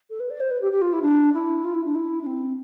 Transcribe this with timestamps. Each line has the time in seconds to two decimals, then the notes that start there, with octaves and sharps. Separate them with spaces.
0.10 A4
0.19 B4
0.30 D5
0.40 C5
0.50 B4
0.61 G4
0.72 G4
0.81 F4
0.92 E4
1.02 D4
1.33 E4
1.64 F4
1.74 E4
1.85 D4
1.95 E4
2.21 D4
2.26 C4